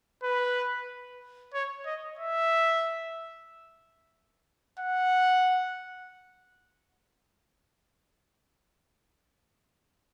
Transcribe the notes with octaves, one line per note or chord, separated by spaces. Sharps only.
B4
C#5
D#5
E5
F#5